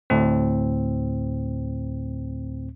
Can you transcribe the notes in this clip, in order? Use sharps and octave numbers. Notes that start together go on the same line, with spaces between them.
D2 A2 C4